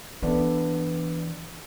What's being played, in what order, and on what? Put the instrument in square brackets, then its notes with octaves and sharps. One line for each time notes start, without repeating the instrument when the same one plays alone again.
[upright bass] E3 [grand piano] B3 D4 A4